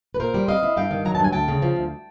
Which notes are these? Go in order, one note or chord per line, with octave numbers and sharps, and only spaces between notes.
B4
A#2 A#4 C5
G3
C4 D#5 F5
E4
G2 F5 G5
D#3
F#3 A#5
A5
G2 G#5
D2 G5 A5
C#3
F3
D2